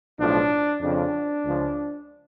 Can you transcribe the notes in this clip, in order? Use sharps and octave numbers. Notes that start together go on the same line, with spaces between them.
B1 A2 F3 D4
F2 C#3 F3 D4
C#2 C#3 F3